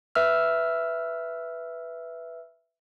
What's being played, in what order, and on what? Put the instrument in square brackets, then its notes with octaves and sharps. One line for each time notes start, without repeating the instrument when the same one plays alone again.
[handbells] B4 E5 E6 F6